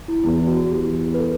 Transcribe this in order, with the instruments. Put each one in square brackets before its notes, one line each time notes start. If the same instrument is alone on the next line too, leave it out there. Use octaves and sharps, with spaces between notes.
[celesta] E4
[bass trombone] E2 [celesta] E4
[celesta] F#4
[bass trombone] E2 [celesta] G4
[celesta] B4
A4